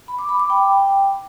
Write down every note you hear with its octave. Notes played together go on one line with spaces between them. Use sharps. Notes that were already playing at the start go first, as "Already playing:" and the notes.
B5
D6
B5
D6
G5